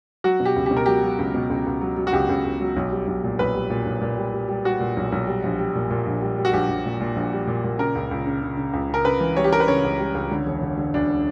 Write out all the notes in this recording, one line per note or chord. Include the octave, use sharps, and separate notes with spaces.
F#3 F#4
B2
G4
C#2
G4
B2
A#4
F#3 G4
F#3
C#2
B2
C#2
C#2
F#3
F#3
F#4
C#2 G4
C#2
C#2
F#3
B1
G3
B1
A#2
B1 B4
G3
A#2
B1
A#2
G3
G3
G3
G3 F#4
A#2
B1
B1
G3
A#1
G3
A#2
A#2
A#1
G3
G3
F#4
A#1 G4
A#1
A#2
A#2
A#1
G3
A#2
A#2
C#3 A#4
C#2
C#2
C#3
C#3
C#3
C#2
C#3 A#4
C#3 B4
E3
G3 C#5
G4
G3 A#4
B4
C#3 C#5
C#2
G3
C#2
D3
E1
D3
D3
D2 D4